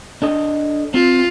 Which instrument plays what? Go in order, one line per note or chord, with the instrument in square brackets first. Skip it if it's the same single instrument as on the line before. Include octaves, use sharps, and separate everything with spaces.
[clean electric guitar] D4 A4 D#5
[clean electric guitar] C4 [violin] F4